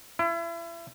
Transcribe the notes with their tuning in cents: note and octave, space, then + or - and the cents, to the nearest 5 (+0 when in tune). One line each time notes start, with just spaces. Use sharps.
E4 +35